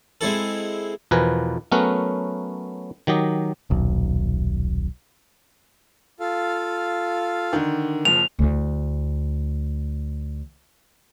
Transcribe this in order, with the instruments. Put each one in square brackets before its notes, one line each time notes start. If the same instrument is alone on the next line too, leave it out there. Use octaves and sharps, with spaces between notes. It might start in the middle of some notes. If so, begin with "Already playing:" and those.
[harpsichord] G#3 C4 E4 A4
[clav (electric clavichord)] E2 B2 F3 A#4 B4 G#5
F#3 A3 B3 C#4 A#4 B4
D#3 F#3 G4 D#5
[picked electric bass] D#1 B1
[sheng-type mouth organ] F4 A4 F5
[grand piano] D3 D#3
[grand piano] F#1 F3 [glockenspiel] F7
[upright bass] D2 E4